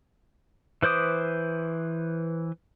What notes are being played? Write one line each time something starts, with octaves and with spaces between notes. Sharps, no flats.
E3 B4 C5 D6 D#6